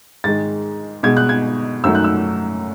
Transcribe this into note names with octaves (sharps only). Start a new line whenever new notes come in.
G#2 D#3 G#3 A6
B2 G#3 G#6
F#6
G#6
F#2 D#3 F#3 A3 E6
F#6
E6